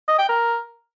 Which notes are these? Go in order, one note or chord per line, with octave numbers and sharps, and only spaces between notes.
D#5
G5
A#4